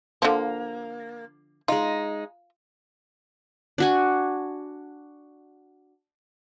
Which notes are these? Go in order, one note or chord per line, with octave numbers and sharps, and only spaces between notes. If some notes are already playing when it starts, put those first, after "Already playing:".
D3 F3 A#3
G#3 D#4 F4
D4 F#4 G#5